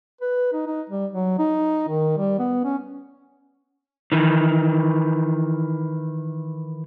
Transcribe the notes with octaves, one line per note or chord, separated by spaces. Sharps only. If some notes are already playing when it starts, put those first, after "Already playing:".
B4
D#4
D#4
G3
F#3
D#4
D#3
G3
B3
C#4
D#3 E3